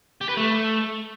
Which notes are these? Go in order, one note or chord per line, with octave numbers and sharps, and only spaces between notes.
G4
B4
A3